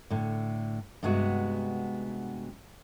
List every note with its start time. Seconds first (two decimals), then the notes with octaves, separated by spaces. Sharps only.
0.11 A2 D3
1.03 G2 C3 G#3 B3 F#4